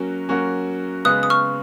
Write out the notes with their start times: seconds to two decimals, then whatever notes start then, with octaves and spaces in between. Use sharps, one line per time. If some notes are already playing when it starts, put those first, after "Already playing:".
Already playing: F#3 A#3 C#4 F#4
0.29 F#3 A#3 C#4 F#4
1.05 C#3 G#3 B3 D#6 F#6
1.23 D#6
1.30 C#6 F6